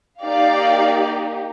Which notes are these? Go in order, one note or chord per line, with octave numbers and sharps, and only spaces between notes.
A#3 D#4 G4 D5 F5